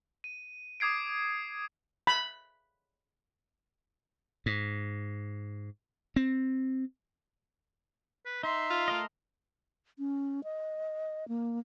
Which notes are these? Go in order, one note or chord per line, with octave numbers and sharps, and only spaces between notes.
D#7
D6 D#6 G#6 C7 D7
B5
G#2
C4
B4
D#4 E5 C6
F4
A3 A#4 D#5
C#4
D#5
A#3